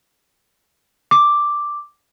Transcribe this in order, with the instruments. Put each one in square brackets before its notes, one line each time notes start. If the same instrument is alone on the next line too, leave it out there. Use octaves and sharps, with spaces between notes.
[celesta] D6